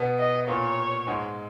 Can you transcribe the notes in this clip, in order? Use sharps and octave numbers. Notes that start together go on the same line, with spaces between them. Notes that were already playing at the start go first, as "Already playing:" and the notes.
Already playing: B2 B3
D#5
A#2 A#3 C#5
G#2 G#3